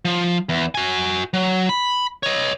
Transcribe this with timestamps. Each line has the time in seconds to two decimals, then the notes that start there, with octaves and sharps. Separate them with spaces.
0.05 F3
0.49 E2
0.75 F#4 G#5
1.34 F#3
1.69 B5
2.23 C#5 D#5